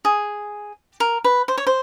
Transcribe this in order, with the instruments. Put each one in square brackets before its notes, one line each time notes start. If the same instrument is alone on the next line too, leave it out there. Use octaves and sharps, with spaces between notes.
[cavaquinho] G#4
A#4
B4
C5
C#5
C5